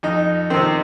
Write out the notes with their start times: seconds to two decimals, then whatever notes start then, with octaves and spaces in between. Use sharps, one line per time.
0.03 F2 D#4
0.50 C3 D#3 C4